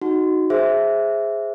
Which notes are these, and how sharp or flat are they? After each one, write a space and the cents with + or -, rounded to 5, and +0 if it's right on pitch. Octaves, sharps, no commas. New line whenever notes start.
D#4 +0 F#4 +0
G#4 +0 C5 +0 E5 +0